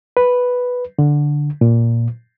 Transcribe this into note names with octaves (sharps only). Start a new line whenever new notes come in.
B4
D3
A#2